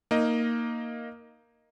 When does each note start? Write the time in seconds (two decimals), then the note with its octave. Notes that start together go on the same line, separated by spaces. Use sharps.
0.11 A#3 D#4 D#5